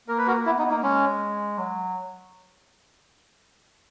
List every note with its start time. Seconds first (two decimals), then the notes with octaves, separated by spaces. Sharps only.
0.08 A#3 A#4
0.18 B4
0.27 F#4 A#4
0.46 B3 E4
0.58 B3 D#4
0.70 A#3 D#4
0.83 G#3 C#4
1.58 F#3